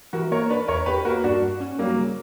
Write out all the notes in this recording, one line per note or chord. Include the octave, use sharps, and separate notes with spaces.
E3 F#4 A#4
A#3 A#4 C#5
D4 B4 D5
E2 A#4 C#5
E2 G4 B4
A#3 F#4 A#4
G2 D4 F#4
G2
C#4
F#3 G3 A#3
C#3